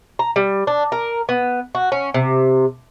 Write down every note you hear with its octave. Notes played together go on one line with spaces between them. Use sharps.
A#5
G3
D4
A#4
B3
F#4
C#4
C3